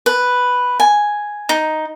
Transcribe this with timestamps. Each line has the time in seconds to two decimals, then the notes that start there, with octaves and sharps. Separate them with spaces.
0.06 B4
0.80 G#5
1.49 D#4